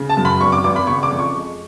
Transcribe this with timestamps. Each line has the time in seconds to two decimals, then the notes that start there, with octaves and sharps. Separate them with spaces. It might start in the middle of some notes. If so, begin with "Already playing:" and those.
Already playing: C#3
0.10 A5
0.17 F#2
0.25 B5
0.41 G#1 C#6
0.52 D6
0.64 G#1 D6
0.76 B5
0.87 C#3 C#6
1.03 D6
1.11 F2
1.19 C#6
1.34 G#3